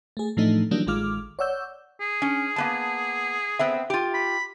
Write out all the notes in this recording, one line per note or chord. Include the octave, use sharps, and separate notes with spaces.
A3 G#4
A2 E3 F3 A3 D4 D#4
D#3 E3 F#3 G3 A#3 D4
A1 D#3 G#3 F4 D6 F6
C#5 D5 F#5 E6 G6
G#4
C#4
A#3 B3 A5
B3 C4 E5
F4 G4
B5